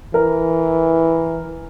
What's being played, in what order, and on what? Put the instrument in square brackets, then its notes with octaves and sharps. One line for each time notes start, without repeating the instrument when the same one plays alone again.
[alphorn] E3 [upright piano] A#4